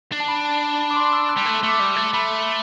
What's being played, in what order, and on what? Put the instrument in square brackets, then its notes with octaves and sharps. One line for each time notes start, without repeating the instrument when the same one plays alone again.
[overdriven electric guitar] D4
[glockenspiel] A5
B5
A5
A5
B5
D6
C6
E6
F#6
[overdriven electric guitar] G3
[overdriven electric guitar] A3 [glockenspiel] E6
[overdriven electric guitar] A3
[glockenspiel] D6
[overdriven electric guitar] G3
A3
[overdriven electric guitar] A3 [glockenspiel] B5